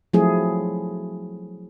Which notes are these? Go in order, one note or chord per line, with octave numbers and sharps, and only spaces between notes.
F3 F#3 A3 C4 E4 G#4